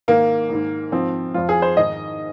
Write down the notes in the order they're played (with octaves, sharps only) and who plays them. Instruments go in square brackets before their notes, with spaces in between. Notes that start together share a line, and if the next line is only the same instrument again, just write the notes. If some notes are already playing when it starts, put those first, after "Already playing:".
[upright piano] G#2 D#3 A#3
G#2 D#3
G#2 F3 C4
F2 F3 F4
G#4
C5
G#2 D#3 D#5